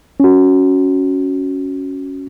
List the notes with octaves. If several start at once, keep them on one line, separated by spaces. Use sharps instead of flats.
C#4 F#4